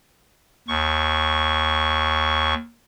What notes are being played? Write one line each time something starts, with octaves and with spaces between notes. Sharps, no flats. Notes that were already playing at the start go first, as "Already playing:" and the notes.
D#2 C#6